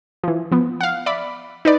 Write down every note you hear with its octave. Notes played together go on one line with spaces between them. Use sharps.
E3 F3
F3 B3
F5 F#5
D5 E5 B5
D#4 B4 D5